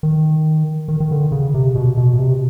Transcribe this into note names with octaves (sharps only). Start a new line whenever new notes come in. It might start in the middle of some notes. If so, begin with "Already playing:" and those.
D#3
D#3
D#3
D3
C#3
C3
B2
B2
B2
C3